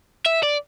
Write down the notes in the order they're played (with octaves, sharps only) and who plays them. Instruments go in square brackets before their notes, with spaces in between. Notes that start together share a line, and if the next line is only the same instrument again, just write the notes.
[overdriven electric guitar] E5
D5